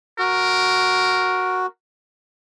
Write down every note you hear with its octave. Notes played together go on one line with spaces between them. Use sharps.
F#4 A#4